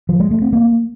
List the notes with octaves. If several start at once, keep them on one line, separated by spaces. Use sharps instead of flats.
F3
G#3
A3
C4
A#3